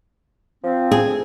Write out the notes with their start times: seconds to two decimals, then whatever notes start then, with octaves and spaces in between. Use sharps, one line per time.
0.64 F3 C4
0.92 G#4